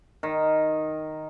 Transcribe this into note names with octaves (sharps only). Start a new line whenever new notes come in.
D#3